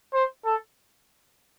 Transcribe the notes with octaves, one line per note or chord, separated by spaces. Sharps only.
C5
A4